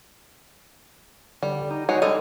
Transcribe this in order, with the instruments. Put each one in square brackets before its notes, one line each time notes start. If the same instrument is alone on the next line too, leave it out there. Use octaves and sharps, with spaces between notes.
[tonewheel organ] D3 [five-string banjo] G3
[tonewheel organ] D#4
[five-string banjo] G#3 [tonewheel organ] D#4 C#5 [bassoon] F#4
[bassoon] D3 [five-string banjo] G3 [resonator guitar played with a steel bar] D#5